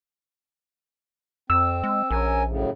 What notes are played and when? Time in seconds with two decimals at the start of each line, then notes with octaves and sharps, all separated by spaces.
1.50 F2 C4 E6
1.84 G#3
2.11 A#1 C#4 A#4 G#5
2.46 F#2 A2 C#3